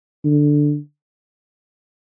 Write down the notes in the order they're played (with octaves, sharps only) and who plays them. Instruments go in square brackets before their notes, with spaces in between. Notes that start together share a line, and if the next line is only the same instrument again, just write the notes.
[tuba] D3